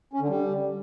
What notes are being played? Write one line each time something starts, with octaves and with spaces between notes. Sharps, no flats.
C#4
D3
G3